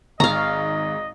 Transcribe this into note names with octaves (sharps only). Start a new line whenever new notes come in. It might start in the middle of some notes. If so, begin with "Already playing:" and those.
G#1 G#2 D#5 F5 A#5 C#6